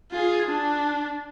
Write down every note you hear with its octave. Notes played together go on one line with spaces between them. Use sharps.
F4 G#4
D4